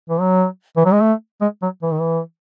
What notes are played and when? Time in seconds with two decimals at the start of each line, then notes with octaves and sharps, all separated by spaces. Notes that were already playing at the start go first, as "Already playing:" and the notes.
0.10 E3
0.21 F#3
0.77 E3
0.85 F#3
0.93 G#3
1.01 A3
1.41 G#3
1.62 F#3
1.83 E3
1.92 D#3
2.00 E3